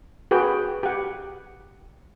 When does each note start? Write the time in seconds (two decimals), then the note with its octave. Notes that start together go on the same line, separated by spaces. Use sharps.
0.31 F#4 G#4 B4 G5
0.83 G4 F#5